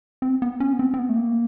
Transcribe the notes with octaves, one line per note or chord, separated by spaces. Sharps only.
C4
B3
C#4
B3
C4
C4
B3
A3
A#3